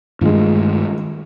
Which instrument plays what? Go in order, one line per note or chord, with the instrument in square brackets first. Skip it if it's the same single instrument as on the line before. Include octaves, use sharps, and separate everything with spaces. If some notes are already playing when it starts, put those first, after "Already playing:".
[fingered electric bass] G2 D#3 A3 [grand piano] G#3 F4